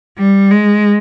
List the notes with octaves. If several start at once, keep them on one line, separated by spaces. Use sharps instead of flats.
G3
G#3